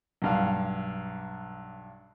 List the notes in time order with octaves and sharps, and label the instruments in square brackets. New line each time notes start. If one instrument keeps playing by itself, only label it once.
[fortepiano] B1 G2 F5